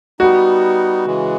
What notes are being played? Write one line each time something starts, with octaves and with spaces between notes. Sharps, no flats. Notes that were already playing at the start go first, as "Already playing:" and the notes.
G3 B3 D#4 F#4
C#3 E3 G#3